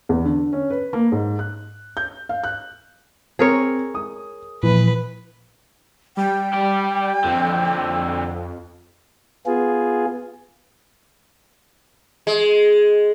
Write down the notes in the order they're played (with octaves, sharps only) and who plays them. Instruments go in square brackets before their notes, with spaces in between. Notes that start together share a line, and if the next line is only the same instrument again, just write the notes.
[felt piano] E2
D3
C#4
B4
A#3
G#2
F#6
G6
F5
F#6
[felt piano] C4 [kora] G#4 A#4 C#5
[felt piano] D#6
[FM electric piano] A#2 F3 [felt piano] E3 [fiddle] B4
[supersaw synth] G3 [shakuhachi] G5
[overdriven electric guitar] G4 D5
[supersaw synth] F2 [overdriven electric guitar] D3 C4
[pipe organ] B3 F4 G#4
[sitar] G#3